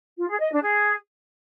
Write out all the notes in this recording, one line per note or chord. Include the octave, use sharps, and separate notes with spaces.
F4
G#4
D#5
D4
G#4